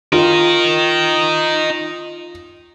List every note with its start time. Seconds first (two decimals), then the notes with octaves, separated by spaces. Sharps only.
0.13 D#4 F4 A#4